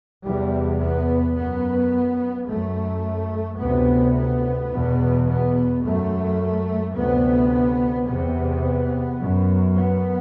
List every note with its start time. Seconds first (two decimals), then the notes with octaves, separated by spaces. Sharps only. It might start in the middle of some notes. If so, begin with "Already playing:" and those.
0.24 E2 C3 G3
0.80 B3
1.36 F#2 B3
2.48 F#2 A3
3.60 D2 C3 B3
4.16 B3
4.72 E2 B2
5.28 B3
5.84 F#2 A3
6.96 D2 C3 B3
8.08 E2 C3 B3
9.20 F#2
9.76 B3